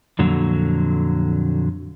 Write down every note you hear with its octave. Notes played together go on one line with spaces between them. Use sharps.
F2 A#2 D3 F#3